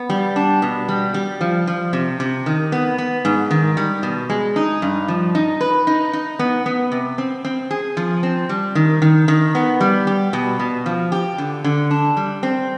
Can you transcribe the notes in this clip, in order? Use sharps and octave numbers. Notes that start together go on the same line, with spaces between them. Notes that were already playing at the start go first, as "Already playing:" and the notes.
Already playing: B3
G3
D4
B2
G3
G3
F3
F3
C3
C3
D#3
B3
B3
G#2
D#3
G3
B2
G#3
D#4
G2
F3
D#4
B4
D#4
D#4
B3
B3
C3
C4
C4
G#4
F3
C4
G3
D#3
D#3
D#3
B3
G3
G4
B2
B2
F3
G4
D3
D3
D4
G3
C4